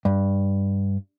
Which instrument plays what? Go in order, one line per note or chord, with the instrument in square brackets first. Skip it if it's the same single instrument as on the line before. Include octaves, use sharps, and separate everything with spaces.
[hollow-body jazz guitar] G2